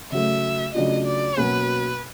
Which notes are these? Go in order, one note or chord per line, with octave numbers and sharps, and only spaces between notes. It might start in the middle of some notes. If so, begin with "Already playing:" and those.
C#3 F#3 A3 E5
C#3 F#3 A3 D4 F4 D#5
D5
B2 F#3 A#3 C#4 B4